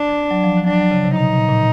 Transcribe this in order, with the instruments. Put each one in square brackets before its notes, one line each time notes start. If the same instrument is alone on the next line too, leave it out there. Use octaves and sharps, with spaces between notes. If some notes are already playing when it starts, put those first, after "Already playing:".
Already playing: [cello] D4
[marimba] F#3
F3
[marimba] F#3 [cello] D4
[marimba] F#3
C#3
C3
[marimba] B2 [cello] D#4
[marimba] A#2
A#2